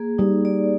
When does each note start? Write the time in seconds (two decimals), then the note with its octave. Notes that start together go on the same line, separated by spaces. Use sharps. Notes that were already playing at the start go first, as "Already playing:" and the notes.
Already playing: A#3 G#4
0.18 G3 D#4
0.45 D5